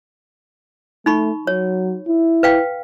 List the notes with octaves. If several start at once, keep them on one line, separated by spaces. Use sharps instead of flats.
A3 D#4 B5 C#6
F#3 C#5
E4
B4 F5 G5